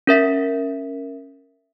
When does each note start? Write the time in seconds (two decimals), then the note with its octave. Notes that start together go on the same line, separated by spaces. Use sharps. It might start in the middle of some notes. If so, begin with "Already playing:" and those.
0.07 C#4 A#4 E5 B6